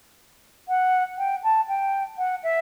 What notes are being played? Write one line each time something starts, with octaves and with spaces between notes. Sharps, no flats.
F#5
G5
A5
G5
F#5
E5